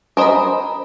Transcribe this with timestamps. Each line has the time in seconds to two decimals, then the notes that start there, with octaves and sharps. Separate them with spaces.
0.17 A#4 C5 D#5 A#5 B5